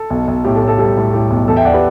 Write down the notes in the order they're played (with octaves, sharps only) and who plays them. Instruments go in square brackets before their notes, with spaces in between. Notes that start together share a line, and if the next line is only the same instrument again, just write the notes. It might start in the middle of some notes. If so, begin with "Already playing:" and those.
Already playing: [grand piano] A4
B1
B1
A2 G4
A4
A2
A4
G3 A4
A2
A2 G4
B1
E2 A4
E5 G5
E2 D5 F#5
G4 B4